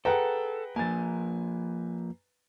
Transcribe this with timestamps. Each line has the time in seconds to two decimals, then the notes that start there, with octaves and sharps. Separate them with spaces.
0.05 G#4 A4 B4 F#5 G5 A#5
0.76 F3 A#3 G#5 A6